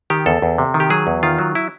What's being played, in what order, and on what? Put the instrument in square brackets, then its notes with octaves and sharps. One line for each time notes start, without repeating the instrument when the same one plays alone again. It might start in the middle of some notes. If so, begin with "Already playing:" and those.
[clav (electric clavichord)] D#3 G4
E2 A4
E2
C3
D#3
G4
F#3 G#4
E2
D#3 F4
F#3
E4